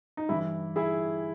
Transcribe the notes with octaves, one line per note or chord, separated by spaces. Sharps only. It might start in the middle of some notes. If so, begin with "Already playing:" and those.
D#4
G2 E3 E4
E4 G#4